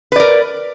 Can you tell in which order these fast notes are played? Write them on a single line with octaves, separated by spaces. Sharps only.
B4 D5 A#4